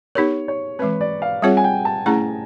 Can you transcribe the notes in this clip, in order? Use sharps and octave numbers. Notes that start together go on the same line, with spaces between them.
B3 D#4 G4 A#4 C#5
C#5
E3 G#3 C4 B4
D5
F5
G3 C4 F4 G#4 C#5 F#5
G#5
G5
A5
A3 C#4 E4 G#4 A#5